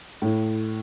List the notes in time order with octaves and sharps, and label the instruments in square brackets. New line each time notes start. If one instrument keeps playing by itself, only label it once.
[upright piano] A2